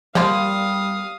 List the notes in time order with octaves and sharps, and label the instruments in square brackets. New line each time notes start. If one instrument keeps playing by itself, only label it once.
[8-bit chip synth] F3 [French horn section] G3 [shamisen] A#3 F4 [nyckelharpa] F5 D#6